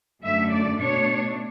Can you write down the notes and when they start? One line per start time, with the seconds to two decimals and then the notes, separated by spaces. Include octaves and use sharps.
0.24 F#2 D3 A3 E5
0.53 D5
0.80 B2 A3 D4 C#5